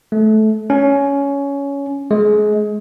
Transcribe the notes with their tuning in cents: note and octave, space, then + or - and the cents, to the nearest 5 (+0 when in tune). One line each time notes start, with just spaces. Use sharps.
A3 -20
C#4 +15
G#3 +25